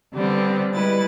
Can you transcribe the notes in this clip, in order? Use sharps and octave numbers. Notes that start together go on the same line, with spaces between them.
D3 G3 B3 C4
G3 G#3 E4 B4 A6